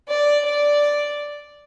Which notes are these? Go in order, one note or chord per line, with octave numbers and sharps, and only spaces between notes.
D5
D5